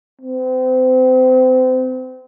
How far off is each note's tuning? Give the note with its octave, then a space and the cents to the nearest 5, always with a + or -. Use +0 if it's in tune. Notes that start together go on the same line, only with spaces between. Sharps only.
C4 -30